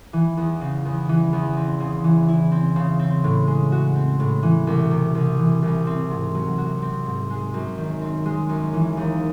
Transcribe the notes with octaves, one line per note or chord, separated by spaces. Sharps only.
E3
E2
C#3
E2
E3
E2
C4
C#3
E3
E4
C4
C#3
C4
A2
G#3
F#4
C4
A2
E3
C2
C3
C2
E3
C2
C4
G#2
F#3
F#4
C4
G#2
G#3
F#2
D#3
C4
G#3
F#2
E3
D#2